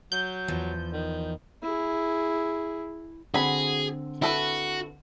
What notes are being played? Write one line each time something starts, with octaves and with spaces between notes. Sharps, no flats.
F#3 G6
E2 F3
D#3
E4 G#4
D3 C4 F#4 G#4 B5
E4 F#4 A4 B4